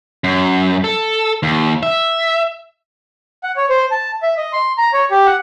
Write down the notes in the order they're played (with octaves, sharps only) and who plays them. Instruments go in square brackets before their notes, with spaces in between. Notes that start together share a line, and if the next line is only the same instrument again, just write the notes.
[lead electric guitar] F#2
A4
D#2
E5
[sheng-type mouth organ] F#5
C#5
C5
A5
E5
D#5
C6
A#5
C#5
G4
F#5